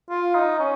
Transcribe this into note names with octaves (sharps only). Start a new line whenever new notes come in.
F4
D#4
C#4